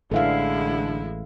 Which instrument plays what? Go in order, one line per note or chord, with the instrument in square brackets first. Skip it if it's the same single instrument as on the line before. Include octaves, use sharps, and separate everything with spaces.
[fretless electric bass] A1 E3 [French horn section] D3 [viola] G#3 E4 [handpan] A4 E5 F5